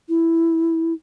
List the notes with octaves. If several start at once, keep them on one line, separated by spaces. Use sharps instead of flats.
E4